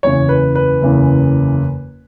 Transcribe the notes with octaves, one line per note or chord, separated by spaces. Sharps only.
F#1 E2 C#3 E3 C#5
B4
B4
F#1 E2 C#3 E3